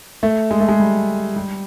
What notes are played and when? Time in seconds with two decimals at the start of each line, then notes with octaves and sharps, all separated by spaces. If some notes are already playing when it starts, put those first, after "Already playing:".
0.23 A3
0.51 G#3
0.60 A3
0.69 G#3
0.80 G3
1.36 G3